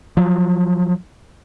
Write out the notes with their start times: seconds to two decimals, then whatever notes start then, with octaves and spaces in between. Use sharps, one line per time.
0.17 F3 F#3